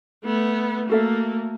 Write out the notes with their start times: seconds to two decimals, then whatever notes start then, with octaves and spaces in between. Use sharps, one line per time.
0.24 A3 B3
0.89 A3 A#3 F#4 A4 E5